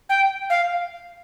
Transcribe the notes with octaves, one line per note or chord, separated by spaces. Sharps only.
G5
F5